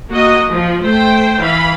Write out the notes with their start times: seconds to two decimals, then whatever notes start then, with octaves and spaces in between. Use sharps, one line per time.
0.10 A#3 F#4 D#5
0.50 F3
0.82 A3 C5 G5
1.40 E3 F5 B5